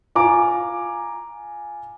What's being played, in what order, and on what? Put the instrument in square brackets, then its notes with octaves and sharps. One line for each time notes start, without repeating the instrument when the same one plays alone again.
[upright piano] F4 G#5 A#5 D6